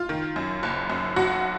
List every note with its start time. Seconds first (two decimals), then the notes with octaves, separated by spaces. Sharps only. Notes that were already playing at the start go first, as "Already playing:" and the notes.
Already playing: F4
0.09 D#3
0.36 F#2
0.63 F#1
0.90 F#2
1.16 B1 F#4